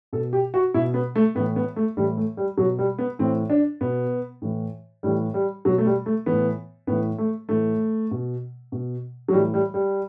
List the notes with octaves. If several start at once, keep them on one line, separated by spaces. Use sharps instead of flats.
B2 A4
G4
F#4
B2 E4
B3
A3
A2 E3 B3
B3
A3
A2 E3 G3
A3
G3
B2 F#3
G3
B3
A2 E3 C4
D4
B2 B3
A2 E3
A2 E3 G3
G3
B2 F#3
A3
G3
A3
A2 E3 B3
A2 E3 B3
A3
A2 E3 A3
B2
B2
F#3
A2 E3 G3
G3
G3